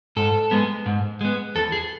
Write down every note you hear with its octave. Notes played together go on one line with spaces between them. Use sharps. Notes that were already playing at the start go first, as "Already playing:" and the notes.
G#2 A4
G#3 B3
G#2
G#3 B3
E2 A4
G#4